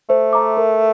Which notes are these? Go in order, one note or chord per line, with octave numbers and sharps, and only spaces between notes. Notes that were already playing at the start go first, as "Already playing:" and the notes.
A3 C5
E5 A#5 D6
A#4